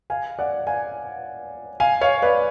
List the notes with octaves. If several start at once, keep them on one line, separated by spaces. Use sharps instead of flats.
F5 G#5
D5 F#5
F5 G#5
F5 G#5
C#5 F5
B4 D5